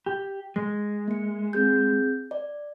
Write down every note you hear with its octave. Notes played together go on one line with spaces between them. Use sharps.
G4
G#3 A#6
A#3 C#7
C4 G#4 G6
D5